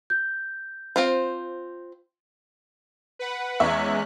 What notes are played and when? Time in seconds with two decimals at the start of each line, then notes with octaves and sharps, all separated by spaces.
0.10 G6
0.96 C4 F4 C5
3.19 B4 F#5
3.60 E2 G#3 C#4 E5 C#6 F#6